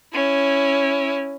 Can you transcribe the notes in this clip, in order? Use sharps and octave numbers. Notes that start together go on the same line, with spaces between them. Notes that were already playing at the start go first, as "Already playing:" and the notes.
C#4 E4